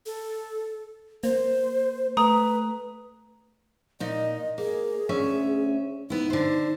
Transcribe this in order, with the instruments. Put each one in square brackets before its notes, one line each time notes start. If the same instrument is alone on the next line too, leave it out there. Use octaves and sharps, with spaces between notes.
[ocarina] A4
[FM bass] A#3 [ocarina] C5
[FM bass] A3 [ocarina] B4 [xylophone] A#5 D#6
[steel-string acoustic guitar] A#2 D#4 [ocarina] D#5
[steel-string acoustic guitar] A#3 [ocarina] G#4
[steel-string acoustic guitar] D2 C#4 E5
[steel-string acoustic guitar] B3 E4 [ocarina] D#4
[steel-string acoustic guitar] D3 C5